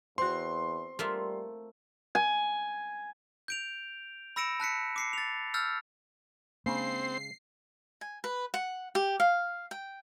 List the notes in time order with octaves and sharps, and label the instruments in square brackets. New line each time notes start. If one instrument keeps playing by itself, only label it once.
[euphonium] E2 [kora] C4 F#4 [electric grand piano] C6
[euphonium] G3 [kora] A3 [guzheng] A#3 F4 E5
[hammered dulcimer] G#5
[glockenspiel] G6 D7 F7
B5 E6 A#6 C#7 D7 E7
A5 F#6 B6 C#7
D6 C7 C#7
A6 F7
E6 F6 G6 A6
[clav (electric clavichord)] C#3 G#3 [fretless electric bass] A#3 D4 [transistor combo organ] C4 [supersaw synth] C7
[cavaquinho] G#5
B4
F#5
G4
F5
G5